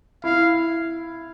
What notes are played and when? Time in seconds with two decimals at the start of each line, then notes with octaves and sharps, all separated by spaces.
0.24 E4 F5